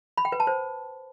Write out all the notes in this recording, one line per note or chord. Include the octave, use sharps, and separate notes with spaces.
B5
G5
B4
A5
C5